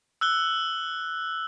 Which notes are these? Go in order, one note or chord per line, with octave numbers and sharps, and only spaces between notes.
E6 F#6 G7